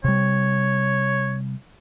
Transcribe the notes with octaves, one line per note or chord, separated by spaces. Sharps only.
C3 G3 C#5